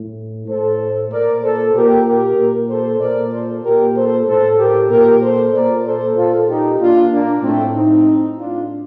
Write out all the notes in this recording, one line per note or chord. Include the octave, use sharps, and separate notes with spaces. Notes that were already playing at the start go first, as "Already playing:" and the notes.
Already playing: A2
A2 A4 C5
A#2 A#4 D5
A4 C5
A#2 G4 A#4
G4 A#4
A#2
A4 C5
A#2 A#4 D5
A4 C5
A#2 G4 A#4
A4 C5
A2 A4 C5
G4 A#4
A#2 G4 A#4
A4 C5
A#2 A#4 D5
A4 C5
A#2 F4 A4
D#4 G4
A#2 D4 F4
A#3 D4
A2 A3 C4
C4 D#4
A2
D4 F4